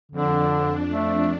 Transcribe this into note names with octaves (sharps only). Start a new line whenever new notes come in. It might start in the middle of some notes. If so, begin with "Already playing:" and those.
F2 D3 D4
A3